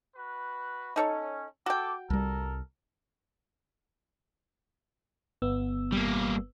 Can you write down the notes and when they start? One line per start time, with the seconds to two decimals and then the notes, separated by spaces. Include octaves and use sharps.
0.15 F#4 B4
0.96 C#4 D#4 A4 C#5
1.66 F#4 A4 G5 D6
2.10 C2 G3 A4 A#4
5.42 G1 B3 E6
5.92 G3 A#3